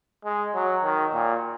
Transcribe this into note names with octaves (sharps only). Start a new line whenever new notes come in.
G#3
F#3
D#3
A#2